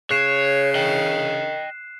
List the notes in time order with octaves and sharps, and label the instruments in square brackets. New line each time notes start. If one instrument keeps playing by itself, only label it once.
[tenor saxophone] C#3 [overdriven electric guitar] C#5 [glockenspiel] F#6 C7 E7
[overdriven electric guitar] D#5 G5